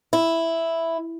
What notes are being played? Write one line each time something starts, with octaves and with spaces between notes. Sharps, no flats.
E4